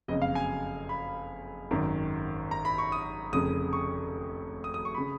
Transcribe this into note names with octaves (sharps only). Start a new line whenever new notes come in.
F#1 F2 C#3 D#5
F5
G#5
B5
G#1 F#2 D#3
A#5
B5
C#6
D#6
F1 F2 C#3 D#6
C#6
D#6
D#6
C#6
C#3 B5